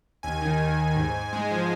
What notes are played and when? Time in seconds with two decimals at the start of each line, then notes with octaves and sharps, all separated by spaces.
0.23 D#2 G#5
0.42 D#3
0.60 D#2
0.78 D#2
0.96 G#2
1.15 G#2
1.33 G#3
1.51 F3